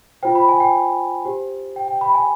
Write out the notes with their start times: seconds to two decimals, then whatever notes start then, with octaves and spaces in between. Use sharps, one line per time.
0.23 F4 C5 G5
0.35 B5
0.49 G#5
0.60 G5
1.25 G4 C5
1.76 G5
1.88 G5
2.01 B5
2.14 G#5